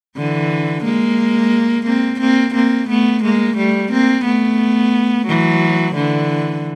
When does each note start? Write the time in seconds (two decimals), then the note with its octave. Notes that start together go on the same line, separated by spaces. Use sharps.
0.17 D3 E3
0.85 G#3 A#3
1.87 A#3 C4
2.20 A#3 C4
2.55 A#3 C4
2.89 A3 B3
3.23 G#3 A#3
3.57 G3 A3
3.92 A#3 C4
4.25 A3 B3
5.27 E3 F#3
5.95 D3 E3